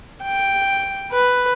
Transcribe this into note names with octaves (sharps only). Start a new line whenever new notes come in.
G5
B4